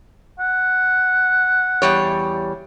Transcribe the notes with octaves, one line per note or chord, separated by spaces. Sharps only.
F#5
E2 G3 C#5